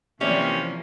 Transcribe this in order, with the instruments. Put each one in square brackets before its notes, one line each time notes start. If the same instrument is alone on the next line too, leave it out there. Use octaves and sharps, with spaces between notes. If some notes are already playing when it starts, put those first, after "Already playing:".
[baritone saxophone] C3 [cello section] E3 F3 A#3 [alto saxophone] C#4 [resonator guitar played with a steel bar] G4 D5 E5